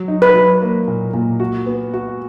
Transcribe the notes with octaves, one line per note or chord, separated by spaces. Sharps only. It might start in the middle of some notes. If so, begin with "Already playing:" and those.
Already playing: F#3
D#4
B4
F#3
A#3
A#2
A#2
F#4
B3
F#4